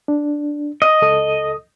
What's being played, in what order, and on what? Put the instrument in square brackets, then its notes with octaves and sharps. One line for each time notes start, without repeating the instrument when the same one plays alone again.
[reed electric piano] D4
[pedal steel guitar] D#5
[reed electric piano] C#2 A4 D#6